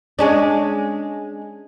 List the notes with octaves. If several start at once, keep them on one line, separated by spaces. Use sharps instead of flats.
G#3 C#4 D4